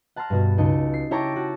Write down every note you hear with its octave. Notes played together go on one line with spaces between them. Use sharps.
F#5 A5 A#5 C6 F6
G2 B2 F#4
C#2 D#4 A5 C#7
C7
E4 G4 C#5 A5 A#5 D6
F#4 A5